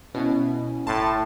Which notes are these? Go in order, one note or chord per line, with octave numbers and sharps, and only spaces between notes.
B2 C#4 E4 G#5
G1 A2 A5 C6